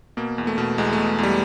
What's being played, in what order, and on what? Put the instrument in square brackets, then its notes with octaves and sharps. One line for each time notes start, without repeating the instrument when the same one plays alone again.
[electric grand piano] B2 A#3
E2
A3
B2
E2 G#3
A3
B2
E2 G3